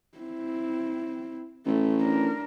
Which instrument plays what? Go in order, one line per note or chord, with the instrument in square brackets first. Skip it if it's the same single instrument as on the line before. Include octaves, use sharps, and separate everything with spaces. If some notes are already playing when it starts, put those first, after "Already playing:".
[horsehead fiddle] C4 E4
[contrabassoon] A1 [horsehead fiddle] A3
[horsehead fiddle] D4 A#4